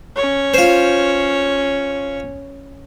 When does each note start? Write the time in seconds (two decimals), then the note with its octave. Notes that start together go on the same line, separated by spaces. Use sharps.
0.16 C#4 C#5
0.54 F4 C5